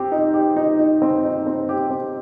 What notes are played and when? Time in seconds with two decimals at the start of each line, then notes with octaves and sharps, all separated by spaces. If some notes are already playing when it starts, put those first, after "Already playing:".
Already playing: C4 G4
0.12 D#4
0.34 G4
0.56 D#4
0.79 D#4
1.02 C4
1.24 D#4
1.47 C4
1.69 G4
1.90 C4